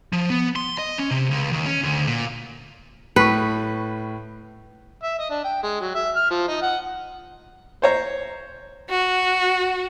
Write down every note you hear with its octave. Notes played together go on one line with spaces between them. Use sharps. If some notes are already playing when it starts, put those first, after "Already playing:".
F3
B3
C6
D#5
C#4
C3
C#2
D#2
C#4
D2
A#2
A2 B4 C#6
E5
D#5
D4
G5
G#3
F#3
E5
F6
F3
D#4
F#5
C5 C#5 A#5
F#4